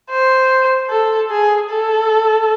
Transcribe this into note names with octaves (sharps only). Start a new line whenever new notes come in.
C5
A4
G#4
A4